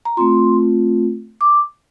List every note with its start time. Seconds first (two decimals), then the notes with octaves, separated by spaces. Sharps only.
0.05 A#5
0.17 A3 C4 F4 C6
1.41 D6